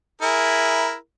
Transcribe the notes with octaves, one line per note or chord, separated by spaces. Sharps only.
E4 G#4 A#4